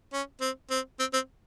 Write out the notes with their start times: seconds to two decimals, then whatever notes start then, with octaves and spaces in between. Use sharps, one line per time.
0.13 C#4
0.41 C4
0.71 C4
0.99 C4
1.14 C4